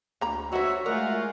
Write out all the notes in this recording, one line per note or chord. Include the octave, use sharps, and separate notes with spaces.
D2 A#3 A#5 B5
D3 G#3 D#4 F#4 C5 C#5 E5
G#3 A3 F4 G#4 A#4 D5 F#5